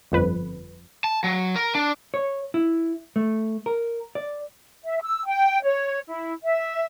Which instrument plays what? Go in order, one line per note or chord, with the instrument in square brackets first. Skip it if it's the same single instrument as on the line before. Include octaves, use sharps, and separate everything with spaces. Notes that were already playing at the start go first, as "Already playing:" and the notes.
[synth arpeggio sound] G1 F2 B4
[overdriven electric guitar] A5
F#3
A#4
D4
[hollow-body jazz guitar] C#5
E4
A3
A#4
D5
[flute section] E5
E6
G5
C#5
E4
E5